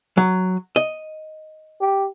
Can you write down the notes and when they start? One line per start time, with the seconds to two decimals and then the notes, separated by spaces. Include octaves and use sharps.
0.17 F#3
0.76 D#5
1.80 G4